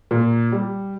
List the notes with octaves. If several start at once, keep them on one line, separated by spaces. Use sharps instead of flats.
A#2
G3